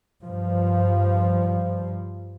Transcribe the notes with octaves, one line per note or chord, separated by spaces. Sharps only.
G2 F3